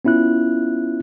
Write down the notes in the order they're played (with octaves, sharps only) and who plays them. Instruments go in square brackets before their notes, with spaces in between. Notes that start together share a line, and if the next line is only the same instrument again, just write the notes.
[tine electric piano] B3 C#4 E4 F4 F#6